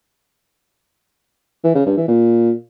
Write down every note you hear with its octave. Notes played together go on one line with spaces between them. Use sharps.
E3
C#3
G2
E3
A#2